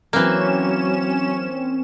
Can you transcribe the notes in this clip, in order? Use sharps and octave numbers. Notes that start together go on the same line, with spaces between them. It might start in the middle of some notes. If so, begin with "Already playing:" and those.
E3 F#3 A#3 C4 C#4 E7